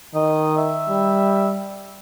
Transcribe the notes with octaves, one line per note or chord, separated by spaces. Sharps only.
D#3 D#5
E5
G3